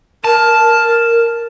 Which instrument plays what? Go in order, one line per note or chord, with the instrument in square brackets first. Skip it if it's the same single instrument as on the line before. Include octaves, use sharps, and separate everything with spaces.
[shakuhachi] A#4 [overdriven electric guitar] A5